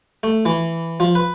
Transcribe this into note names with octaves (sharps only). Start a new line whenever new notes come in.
A3
E3
F3
B4